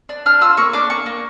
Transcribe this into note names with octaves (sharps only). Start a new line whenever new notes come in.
D4
D4 F6
F4 E6
A#3 C#6
D4 D6
A#3 C#6
A#3